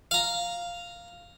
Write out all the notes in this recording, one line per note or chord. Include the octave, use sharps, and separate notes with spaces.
F5 A#5